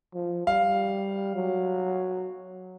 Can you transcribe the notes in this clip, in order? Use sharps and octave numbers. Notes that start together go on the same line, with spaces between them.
F3
G3 F5
F#3